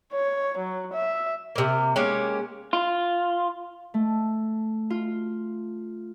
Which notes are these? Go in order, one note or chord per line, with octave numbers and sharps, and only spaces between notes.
C#5
F#3
E5
C3 A#3
G#3 A#3 C#4 G4
F4
A3
F4